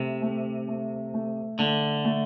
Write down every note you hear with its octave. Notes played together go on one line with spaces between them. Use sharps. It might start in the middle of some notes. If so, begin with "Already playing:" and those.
Already playing: C3 A3
A3
A3
A3
D3 A3
A3